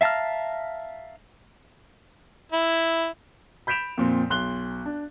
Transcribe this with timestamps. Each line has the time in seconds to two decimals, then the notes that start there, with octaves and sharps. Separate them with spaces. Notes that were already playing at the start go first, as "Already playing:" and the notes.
0.01 E5 F5 A5 A#5 F6
2.52 E4
3.67 B5 G6 B6 D7 E7 F7
3.98 F2 A#2 C4
4.30 B1 C6 F#6 G7
4.86 D4